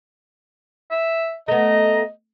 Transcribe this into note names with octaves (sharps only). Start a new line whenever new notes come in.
E5
A3 B3 D#5 A#5